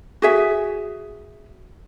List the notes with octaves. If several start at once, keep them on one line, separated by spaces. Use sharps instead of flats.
F#4 G#4 E5